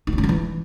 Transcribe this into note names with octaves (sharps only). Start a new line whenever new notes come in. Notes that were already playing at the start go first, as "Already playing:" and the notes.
D#4
F4
C#4
F#3
E3